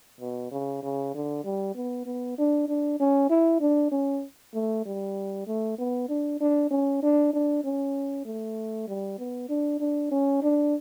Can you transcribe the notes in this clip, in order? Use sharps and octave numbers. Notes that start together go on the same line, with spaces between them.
B2
C#3
C#3
D3
G3
B3
B3
D4
D4
C#4
E4
D4
C#4
A3
G3
A3
B3
D4
D4
C#4
D4
D4
C#4
A3
G3
B3
D4
D4
C#4
D4